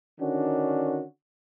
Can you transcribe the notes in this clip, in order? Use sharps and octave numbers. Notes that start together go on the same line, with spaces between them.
D3 D#3 C#4 D4 F#4